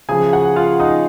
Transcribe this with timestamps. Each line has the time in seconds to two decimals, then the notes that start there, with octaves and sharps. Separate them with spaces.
0.09 C#3 F3 G#4 G#5
0.33 F#4 F#5
0.56 F4 F5
0.80 D#4 D#5